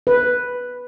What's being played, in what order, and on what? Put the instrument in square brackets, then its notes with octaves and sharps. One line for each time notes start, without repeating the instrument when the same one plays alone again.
[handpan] B4